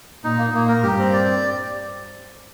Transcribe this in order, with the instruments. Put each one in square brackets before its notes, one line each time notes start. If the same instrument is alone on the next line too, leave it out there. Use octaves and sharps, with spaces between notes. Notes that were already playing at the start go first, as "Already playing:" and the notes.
[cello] A#2 [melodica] D#4
[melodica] A#3
[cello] A#2 [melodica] A#3
[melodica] A#4
[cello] G2 [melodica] G4
[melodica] C4
D5